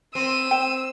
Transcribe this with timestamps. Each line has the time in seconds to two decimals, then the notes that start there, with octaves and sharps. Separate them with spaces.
0.15 C4 E6 D#7
0.51 G5